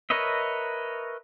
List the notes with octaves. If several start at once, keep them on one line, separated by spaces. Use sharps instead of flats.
A#4 B4 C#5 D#5 E5